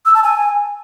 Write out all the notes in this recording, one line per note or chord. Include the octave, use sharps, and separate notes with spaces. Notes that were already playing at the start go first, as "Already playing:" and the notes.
E6
A5
G#5